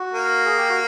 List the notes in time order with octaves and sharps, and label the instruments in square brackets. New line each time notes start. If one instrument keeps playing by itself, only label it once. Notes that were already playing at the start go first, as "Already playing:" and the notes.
Already playing: [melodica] F#4
[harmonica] A#3
[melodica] G#4
G4
F#4